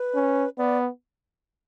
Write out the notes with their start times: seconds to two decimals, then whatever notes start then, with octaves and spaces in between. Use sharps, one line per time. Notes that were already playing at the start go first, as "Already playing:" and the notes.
Already playing: B4
0.15 C#4
0.58 B3 D5